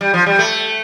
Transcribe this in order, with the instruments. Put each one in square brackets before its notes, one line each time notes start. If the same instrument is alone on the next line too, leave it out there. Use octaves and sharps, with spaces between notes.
[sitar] G3
F3
G3
A3